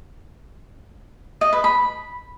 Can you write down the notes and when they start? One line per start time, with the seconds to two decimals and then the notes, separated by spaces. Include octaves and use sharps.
1.41 D#5
1.53 B4
1.64 B5